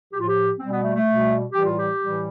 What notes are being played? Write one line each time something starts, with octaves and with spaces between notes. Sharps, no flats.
A2 F3 G4
F4
G4
B2 G3 C4
B3
A3
A3
B2 G3
A2 E3 G3 G4
F4
G4
A2 E3 G3